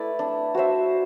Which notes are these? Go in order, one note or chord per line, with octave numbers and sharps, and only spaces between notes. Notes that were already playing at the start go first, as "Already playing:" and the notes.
Already playing: A3 E4 B4 D5
D4
F#4 C5 E5